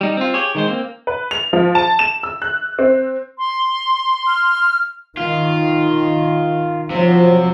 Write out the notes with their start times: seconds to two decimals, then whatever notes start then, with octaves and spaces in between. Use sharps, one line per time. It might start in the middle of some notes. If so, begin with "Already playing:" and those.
0.01 G3 D#4
0.17 C4 F4
0.34 G4 G#4 C#5
0.55 D#3 G#3 C5
0.68 A#3 C4
1.07 B4
1.31 F7
1.53 F3
1.75 A5
1.99 E7
2.23 E6
2.42 F#6
2.79 C4
3.38 C6
4.27 F6
5.17 D#3 F4
6.90 C3 F3 F#3